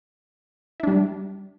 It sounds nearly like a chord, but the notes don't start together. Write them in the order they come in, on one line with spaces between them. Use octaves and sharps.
E4 D4 G3